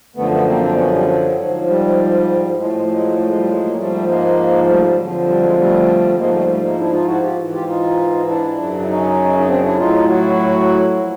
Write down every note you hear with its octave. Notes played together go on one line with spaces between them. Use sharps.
F#2 D3 F3 A3 B3
A3 B3
A#3 C4
C4 D4
B3 C#4
G3
F#3
G#2 F3
G3
A2 F3 G#3
A3
G#3
A3
F#3 G#3
A3
G#3
G3
F#3 G#3
A#3
G#2 F3 G3 A3
G#3 A#3
G3 A3
G3
F2 D3 F3 F#3
G3
F#3 G#3
G3 A3
G#2 F3 G#3 A#3
G3 A3
G3 A3
G#3 A#3
D4 E4
D#4 F4
E4 F#4
F4 G4
G#2 E3
F4 G4
D#4 F4
D4 E4
F#2 C#3 F#3
E4
C#4 D#4
D#4
C4 D4
D4 E4
A2 F#3 D#4 F4
E4 F#4
A#2 F3